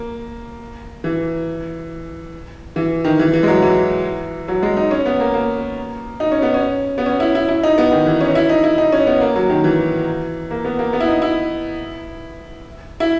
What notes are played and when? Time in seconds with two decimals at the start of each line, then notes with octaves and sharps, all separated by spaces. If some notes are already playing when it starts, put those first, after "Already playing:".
Already playing: A#3
1.04 E3
2.76 E3
3.05 D#3
3.19 E3
3.33 E3
3.43 G#3
3.48 F#3
3.62 E3
4.48 F#3
4.63 G#3
4.77 D#4
4.91 C#4
5.06 B3
5.20 A#3
5.34 A#3
6.20 D#4
6.32 C#4
6.42 B3
6.54 C#4
6.98 B3
7.06 C#4
7.20 E4
7.35 E4
7.49 E4
7.63 D#4
7.78 B3
7.92 D#3
8.06 E3
8.21 C#4
8.35 E4
8.49 D#4
8.64 E4
8.78 D#4
8.92 C#4
9.07 B3
9.21 A#3
9.36 F#3
9.50 D#3
9.64 E3
10.51 A#3
10.65 B3
10.79 A#3
10.93 B3
11.00 E4
11.08 D#4
11.22 E4
13.00 E4